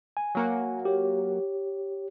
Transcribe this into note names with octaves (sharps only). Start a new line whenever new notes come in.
G#5
F#3 A#3 F#4
G4 C#5